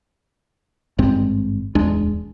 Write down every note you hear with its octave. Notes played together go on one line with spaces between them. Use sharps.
G#1 G2 G#3 C4
D1 E2 G#3 D4